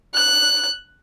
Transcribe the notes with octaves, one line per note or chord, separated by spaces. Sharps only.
F#6